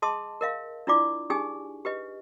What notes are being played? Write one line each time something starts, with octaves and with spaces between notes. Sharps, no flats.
G#4 D#5 A5 C6 D#6
A#4 D#5 F5
D4 E4 F4 D5 D6
D4 D#4 G4 G#4 G#5 D#6
G4 B4 D#5